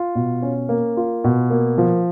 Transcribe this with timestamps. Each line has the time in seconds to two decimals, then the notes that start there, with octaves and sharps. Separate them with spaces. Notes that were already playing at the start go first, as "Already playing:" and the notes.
Already playing: F4
0.15 B2
0.42 C#4
0.69 A#3
0.97 F4
1.24 B2
1.50 A#3
1.78 F3